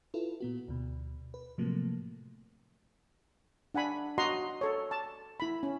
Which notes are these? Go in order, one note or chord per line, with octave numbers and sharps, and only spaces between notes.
E4 F4 A4 B4
A#2 B3 F#4
D2 B2
B4
A2 C3 F3 F#3 A3 A#3
D4 F#5 G#5 B5
F#4 D#5 F#5 A#5 C6
A4 C#5
A5
E4 B5
C#4